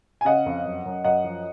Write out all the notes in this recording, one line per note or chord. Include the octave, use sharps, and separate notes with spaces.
G#5
C#3 D#5 F#5
F2
F#2
F#2
F#2 D#5 F#5
F3